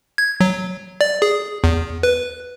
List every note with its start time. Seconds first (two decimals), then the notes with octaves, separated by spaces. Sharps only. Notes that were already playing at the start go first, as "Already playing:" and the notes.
0.18 G#6
0.41 F#3
1.01 D5
1.22 G#4
1.64 E2
2.03 B4